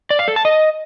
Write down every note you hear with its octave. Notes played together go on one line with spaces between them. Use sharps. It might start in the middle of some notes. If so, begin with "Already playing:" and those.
D5
F5
A4
A5
D#5